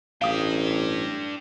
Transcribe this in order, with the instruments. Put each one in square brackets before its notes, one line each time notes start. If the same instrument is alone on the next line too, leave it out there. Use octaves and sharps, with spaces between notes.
[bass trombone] A1 [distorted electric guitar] D4 G5 [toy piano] F5 D#6